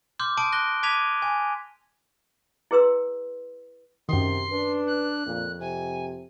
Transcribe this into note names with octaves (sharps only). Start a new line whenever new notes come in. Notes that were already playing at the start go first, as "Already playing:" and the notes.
C6 D6 F6 G6
A5 C6 D#6 G6 D7
F#6 A#6 G7
A5 D6 G#6 B6 D#7 F7
G#5
E4 G#4 B4 C6 E6
F#2 C3 D#3 C6
D4 B4
F#6
F2 A#2
C3 G#5